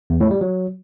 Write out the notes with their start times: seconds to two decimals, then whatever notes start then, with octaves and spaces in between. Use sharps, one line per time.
0.10 E2
0.20 A2
0.31 G3
0.41 F#3